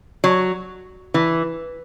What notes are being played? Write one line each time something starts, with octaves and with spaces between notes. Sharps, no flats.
F#3
E3